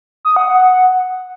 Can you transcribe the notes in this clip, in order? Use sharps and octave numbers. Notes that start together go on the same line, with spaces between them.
D#6
F#5
F#5